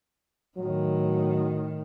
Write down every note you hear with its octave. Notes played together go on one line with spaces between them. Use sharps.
A2 D#3 F#3